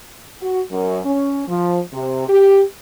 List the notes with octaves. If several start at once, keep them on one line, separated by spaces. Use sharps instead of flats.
F#4
F#2
C#4
F3
C3
G4